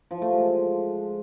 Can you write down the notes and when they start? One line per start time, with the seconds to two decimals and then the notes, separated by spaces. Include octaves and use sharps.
0.11 F3
0.22 A3
0.33 G#3